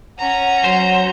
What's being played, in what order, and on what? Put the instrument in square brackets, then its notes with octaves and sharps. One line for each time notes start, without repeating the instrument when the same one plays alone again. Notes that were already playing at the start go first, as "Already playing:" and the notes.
[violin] C#4 A#5 [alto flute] F#5
[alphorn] F#3 [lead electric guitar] C5